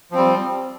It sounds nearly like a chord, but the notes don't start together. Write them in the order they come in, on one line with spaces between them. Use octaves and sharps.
F3 C4 G3